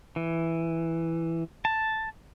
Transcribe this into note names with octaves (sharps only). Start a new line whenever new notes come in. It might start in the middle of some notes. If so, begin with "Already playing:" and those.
E3
A5